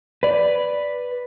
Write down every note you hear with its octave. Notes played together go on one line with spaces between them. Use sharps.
B4 D5